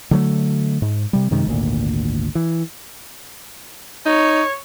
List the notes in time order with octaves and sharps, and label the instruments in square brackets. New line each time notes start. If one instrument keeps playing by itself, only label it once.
[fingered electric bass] D3 F#3 A3
G#2
C3 G3
F#2 C3 D#3 G#3
G#1 D2 A#2
E3
[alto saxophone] D#4 [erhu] C#5